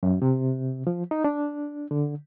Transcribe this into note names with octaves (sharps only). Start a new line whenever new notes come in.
F#2
C3
F3
D#4
D4
D3